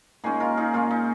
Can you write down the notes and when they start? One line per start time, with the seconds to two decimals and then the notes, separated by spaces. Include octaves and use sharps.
0.24 A#2 G#3 C#4 D#4 G#4
0.40 F4 A#4
0.57 D#4 G#4
0.74 A#2 G#3 C#4 F4
0.91 D#4